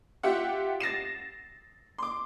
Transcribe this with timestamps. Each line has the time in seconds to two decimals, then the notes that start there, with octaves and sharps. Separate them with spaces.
0.23 F4 G4 E5 F#5
0.80 A6 A#6 C7 E7
1.98 C6 D6